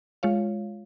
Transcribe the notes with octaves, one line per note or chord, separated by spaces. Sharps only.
G#3 F4 C#5 F5